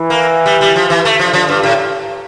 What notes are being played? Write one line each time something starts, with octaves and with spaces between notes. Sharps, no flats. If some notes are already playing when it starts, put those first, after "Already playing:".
Already playing: E3
A#3
G3
G3
F3
E3
A3
D3 F3
F3
G2
A2